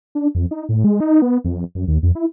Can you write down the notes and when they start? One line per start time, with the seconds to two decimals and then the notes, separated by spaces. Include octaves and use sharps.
0.15 D4
0.35 F2
0.51 D#4
0.69 A2
0.84 G#3
1.00 D#4
1.22 B3
1.44 F2
1.75 F#2
1.88 D#2
2.03 F2
2.15 E4